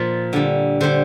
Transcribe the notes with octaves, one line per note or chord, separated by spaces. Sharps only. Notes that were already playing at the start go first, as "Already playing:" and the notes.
Already playing: A#2 F3 A#4
D3 G3
D3 G3 C5